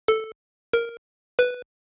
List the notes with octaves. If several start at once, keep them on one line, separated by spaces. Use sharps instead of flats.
A4
A#4
B4